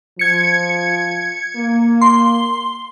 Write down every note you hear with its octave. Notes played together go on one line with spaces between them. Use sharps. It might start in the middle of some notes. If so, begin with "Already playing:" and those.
F3 G#6 C#7
A#3
C6